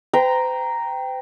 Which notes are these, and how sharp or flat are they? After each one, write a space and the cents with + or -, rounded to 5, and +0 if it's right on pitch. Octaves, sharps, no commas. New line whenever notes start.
C5 -45 G5 +0 A#5 +0